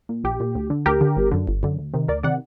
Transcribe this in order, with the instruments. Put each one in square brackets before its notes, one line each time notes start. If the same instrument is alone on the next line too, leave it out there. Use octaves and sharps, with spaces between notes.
[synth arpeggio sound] A#2
A#1 G4
A#2
D2
D3
D2 G4 A#4
D3
G1
F#2 D3
G1
F#2 D3
D2
C3 D#3
D2 A#4 D5
C3 D#3 D5 F#5